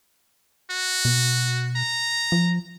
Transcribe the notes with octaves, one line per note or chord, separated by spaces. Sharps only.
F#4
B2
A#5
F3